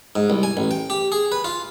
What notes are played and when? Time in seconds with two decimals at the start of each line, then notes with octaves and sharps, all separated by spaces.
0.16 G#2
0.30 C2
0.43 G#5
0.57 A1
0.71 G5
0.90 G4
1.12 G#4
1.32 B4
1.45 F4